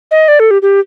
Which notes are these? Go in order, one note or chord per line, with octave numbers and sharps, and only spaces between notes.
D#5
D5
A4
G4
G4